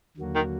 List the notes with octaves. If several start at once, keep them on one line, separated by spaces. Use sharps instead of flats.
D#2 D3 F#3 A#3 F#4
D#3